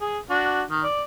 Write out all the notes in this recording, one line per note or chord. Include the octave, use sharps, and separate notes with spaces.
G#4
D4 F#4
D#3
D5